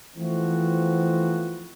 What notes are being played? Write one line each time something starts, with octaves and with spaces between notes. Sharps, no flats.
E3 F3 A3 B3 C4 F#4